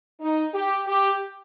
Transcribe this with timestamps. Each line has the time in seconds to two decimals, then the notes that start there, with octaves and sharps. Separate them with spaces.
0.21 D#4
0.54 G4
0.87 G4